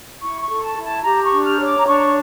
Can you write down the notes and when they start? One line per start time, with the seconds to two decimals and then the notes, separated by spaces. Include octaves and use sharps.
0.21 E4 C#6
0.41 C#6
0.48 A4
0.63 A5
0.76 E4
0.83 A5
1.03 G4 A#5
1.23 C#6
1.31 D4
1.44 F6
1.59 C#5
1.65 D6
1.78 A#5
1.86 D4 C#6